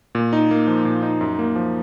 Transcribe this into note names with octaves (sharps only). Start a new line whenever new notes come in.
A#2
D#4
A#3
F3
A#2
D#4
F#2
A#3
F3